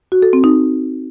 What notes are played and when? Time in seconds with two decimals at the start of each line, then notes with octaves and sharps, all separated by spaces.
0.12 F#4
0.22 A4
0.33 C4
0.44 D#4